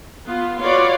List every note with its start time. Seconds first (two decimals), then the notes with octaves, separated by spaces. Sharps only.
0.25 B3 F4
0.60 F4 F#4 B4 C#5 D5